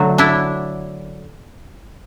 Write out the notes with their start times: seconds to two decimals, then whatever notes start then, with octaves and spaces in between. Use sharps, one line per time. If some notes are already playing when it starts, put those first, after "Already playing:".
Already playing: D3 F#3 A3 F#4
0.18 D4 E4